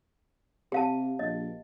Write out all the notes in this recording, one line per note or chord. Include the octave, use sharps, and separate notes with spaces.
C3 G4 F5 A5
A#1 D#5